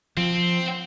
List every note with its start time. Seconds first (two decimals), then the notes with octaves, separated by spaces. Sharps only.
0.17 F3 C4